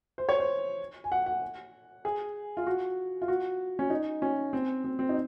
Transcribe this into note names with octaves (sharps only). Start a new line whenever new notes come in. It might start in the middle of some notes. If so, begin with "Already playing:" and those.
C5
C#5
C5
G#5
F#5
F#5
G#4
F4
F#4
F4
F#4
C#4
D#4
C#4
C4
C4
C4
D#4